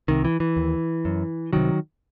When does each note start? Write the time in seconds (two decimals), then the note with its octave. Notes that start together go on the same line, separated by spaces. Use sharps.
0.08 C2 C3 D#3
0.25 E3
0.40 E3
0.57 D#2
1.05 F#2
1.53 C2 C3 D#3 F#3